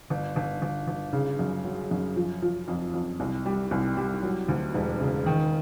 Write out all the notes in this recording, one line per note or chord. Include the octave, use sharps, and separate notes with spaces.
G1
G1
G1
G1
C#3
F#2
F#3
F#2
F3
F3
F2
F2
C2
G3
C2
G3
F#3
D2
E1
C#3
D#3